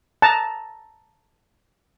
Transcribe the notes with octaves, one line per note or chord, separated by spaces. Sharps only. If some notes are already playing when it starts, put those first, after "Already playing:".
A5 A#5